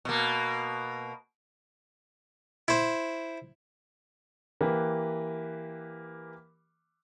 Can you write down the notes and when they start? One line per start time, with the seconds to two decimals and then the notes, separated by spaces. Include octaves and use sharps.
0.05 B2 A#3
2.68 E4 C5
4.61 E3 A#3 G4 B4